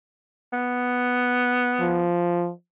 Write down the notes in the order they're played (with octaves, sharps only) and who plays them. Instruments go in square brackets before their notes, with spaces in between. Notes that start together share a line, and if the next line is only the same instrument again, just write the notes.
[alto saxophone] B3
[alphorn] F3